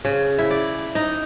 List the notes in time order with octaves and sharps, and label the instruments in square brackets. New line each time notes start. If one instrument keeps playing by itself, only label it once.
[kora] C#3
E4
D5
D#4